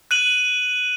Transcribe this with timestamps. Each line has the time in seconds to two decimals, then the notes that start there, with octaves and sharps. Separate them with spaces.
0.11 F#6 D#7 F#7